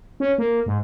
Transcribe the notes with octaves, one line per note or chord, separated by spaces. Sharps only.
C#4
A#3
G#2